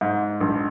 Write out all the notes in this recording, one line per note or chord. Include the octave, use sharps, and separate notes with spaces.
G#2
A#1